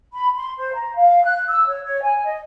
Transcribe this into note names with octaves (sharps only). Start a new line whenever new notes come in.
B5
C6
C5
A#5
F5
F#6
E6
C#5
C#5
G#5
D#5